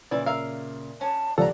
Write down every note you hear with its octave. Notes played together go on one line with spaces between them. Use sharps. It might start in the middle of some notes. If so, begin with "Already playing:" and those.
A#2 C#3 E3 E4 D5
A#4 E5 F5
C#4 A5
D#1 C#2 F3 A4 D5 F#5 A#5